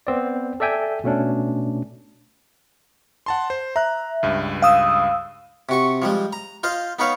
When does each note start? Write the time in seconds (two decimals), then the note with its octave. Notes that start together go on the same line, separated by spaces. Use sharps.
0.07 B3 C4 D5
0.60 A4 D5 E5 G5 G#5
1.04 B2 A3 C#4 D4
3.26 F#5 A5 C6
3.50 C5
3.76 E5 A#5 F#6
4.23 C#2 G2
4.62 F5 D#6 E6
5.69 C3 F#4 C#6
6.02 F3 G3 G#3
6.33 A#5
6.63 F4 C5 D#5 F5
6.99 B3 D#4 B4 C#5 F5